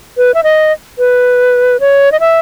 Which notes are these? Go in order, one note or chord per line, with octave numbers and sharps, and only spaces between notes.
B4
E5
D#5
B4
C#5
D#5
E5